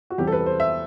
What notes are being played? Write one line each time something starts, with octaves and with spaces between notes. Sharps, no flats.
F#4
E2 C3 E3 G3 G4
A4
B4
C5
E5